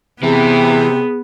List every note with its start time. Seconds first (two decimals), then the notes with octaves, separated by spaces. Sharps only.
0.23 C3 E3 B3 G#4